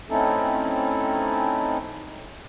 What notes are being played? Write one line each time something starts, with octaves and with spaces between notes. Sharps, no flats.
A3 C4 C#4 D#4 E4 A4